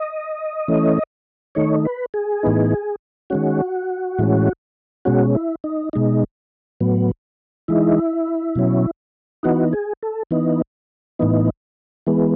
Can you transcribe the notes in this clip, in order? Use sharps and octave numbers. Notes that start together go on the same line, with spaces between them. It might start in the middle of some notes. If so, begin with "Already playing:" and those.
Already playing: D#5
E3 A3 C#4
D#3 A3 D#4 C#5
B4
G#4
A2 E3 B3 D#4
D#3 G#3 C#4 F#4
A2 E3 G#3 C#4
B2 G#3 C#4 F#4
E4
D#4
B2 G#3 D#4
A2 F#3 B3
E3 G#3 D#4 E4
B2 F#3 C#4
E3 B3 D#4 F#4
G#4
A4
E3 B3 D#4
A2 E3 B3 D#4
E3 G#3 B3